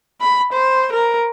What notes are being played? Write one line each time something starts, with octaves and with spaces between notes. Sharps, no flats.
B5
C5
A#4